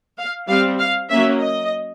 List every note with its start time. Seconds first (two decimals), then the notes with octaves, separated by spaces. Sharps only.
0.18 F5
0.48 G3 C4 F5
0.79 F5
1.09 F#3 A#3 C#4 E5
1.40 D#5